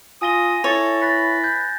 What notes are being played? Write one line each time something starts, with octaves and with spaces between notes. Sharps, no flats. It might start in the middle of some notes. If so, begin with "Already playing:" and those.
F4 G#5 D#6 A#6 G7
E4 A4 C#5
B4 A6 A#6
G6